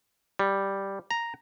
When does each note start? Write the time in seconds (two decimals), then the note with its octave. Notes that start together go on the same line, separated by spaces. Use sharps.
0.39 G3
1.11 A#5